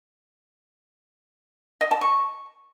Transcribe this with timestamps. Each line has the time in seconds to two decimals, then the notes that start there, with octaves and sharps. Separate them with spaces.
1.81 D#5
1.91 A5
2.01 C#6